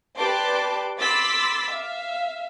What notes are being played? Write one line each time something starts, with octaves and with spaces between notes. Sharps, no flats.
G4 B4 D5 A5 C6 D6
B5 C6 D6 E6 A6 B6
E5 F5